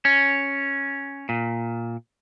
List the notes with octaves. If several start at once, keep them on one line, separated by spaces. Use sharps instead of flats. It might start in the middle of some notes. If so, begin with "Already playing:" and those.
C#4
A#2